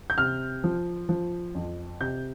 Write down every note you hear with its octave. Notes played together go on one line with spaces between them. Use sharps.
G6
C3 F6
F3
F3
F2
C3 G6